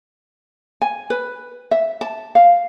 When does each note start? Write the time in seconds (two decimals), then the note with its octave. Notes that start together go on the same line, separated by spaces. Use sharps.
0.82 G#5
1.10 B4
1.71 E5
2.01 A5
2.35 F5